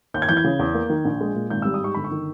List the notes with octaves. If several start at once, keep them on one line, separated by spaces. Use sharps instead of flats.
D#2 G6
G#6
E3 G6
G#6
C#3
E2
A#3
D#3
A#1
G#3
A#2
G#1 G6
G3 E6
D#6
G#2 C#6
G1 B5
C#6
D#3